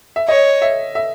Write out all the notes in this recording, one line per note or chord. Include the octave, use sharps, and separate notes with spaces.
E5
C#5 D#5
E5
E5